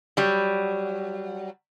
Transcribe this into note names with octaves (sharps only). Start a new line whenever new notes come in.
F#3 G3